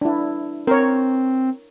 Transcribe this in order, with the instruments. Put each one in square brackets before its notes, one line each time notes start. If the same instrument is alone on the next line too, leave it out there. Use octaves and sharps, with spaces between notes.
[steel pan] D4 E4
[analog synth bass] C4 [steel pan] A#4 C#5